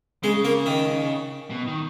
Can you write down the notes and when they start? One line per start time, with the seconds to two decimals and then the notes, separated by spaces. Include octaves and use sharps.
0.23 C#3 G#3
0.45 A#3
0.66 D#3
1.51 B2
1.67 D#3